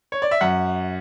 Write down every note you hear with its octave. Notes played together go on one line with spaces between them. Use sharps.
C#5
D5
E5
F#2 F#5